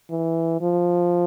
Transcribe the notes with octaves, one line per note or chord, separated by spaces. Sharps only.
E3
F3